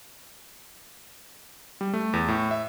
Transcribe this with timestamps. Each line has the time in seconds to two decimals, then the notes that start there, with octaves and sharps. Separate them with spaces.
1.81 G3
1.93 A3
2.13 E2
2.28 A2
2.51 E5